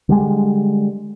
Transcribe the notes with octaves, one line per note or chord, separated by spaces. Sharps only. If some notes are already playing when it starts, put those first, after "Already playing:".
D3 G3 G#3